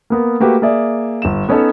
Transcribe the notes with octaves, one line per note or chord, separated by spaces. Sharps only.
A#3 B3 A#4
A3 A#3 F#4 G4 B4
A#3 G#4 D5 E5
G1 E7
B3 C#4 D#4 A4 C#5